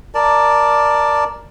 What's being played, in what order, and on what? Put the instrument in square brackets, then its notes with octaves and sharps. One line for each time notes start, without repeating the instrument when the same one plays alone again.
[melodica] A#4 D5 A5